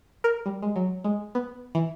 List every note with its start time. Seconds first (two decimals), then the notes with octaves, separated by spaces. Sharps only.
0.24 A#4
0.46 G3
0.62 G#3
0.76 F#3
1.04 G#3
1.35 B3
1.75 E3